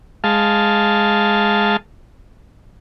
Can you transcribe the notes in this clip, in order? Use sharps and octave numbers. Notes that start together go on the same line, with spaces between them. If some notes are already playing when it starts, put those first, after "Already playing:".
G#3 F5 A5